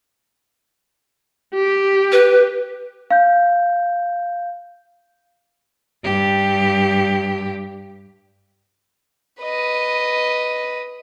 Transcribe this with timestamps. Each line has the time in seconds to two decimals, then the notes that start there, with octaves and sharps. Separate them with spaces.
1.55 G4
2.12 B4
3.11 F5 G6
6.03 G2 G4
9.42 B4 D#5